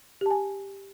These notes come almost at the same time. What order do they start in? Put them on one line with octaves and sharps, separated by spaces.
G4 A5 G#5